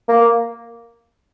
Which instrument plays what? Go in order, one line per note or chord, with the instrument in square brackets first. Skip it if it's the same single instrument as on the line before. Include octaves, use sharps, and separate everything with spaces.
[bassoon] A#3